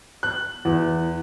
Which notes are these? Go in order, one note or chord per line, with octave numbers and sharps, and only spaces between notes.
F#6
E2